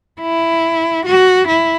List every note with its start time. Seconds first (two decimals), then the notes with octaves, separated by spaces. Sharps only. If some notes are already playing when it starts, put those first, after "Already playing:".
0.21 E4
1.06 F#4
1.48 E4